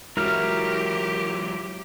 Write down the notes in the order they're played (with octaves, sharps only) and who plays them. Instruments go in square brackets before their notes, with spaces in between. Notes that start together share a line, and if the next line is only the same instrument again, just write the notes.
[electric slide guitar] E3 F#3 [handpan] G#3 E4 F#4 [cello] G4 [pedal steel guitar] A#4 F6